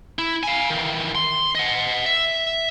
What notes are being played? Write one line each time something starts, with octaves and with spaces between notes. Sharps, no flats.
E4
F5 G#5
D#3 E3
C6
D#5 F#5
E5